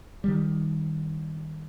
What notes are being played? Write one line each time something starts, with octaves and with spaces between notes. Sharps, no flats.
D#3 G3